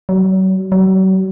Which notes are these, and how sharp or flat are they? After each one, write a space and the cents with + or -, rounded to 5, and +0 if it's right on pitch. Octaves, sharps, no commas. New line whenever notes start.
F#3 +35
F#3 +40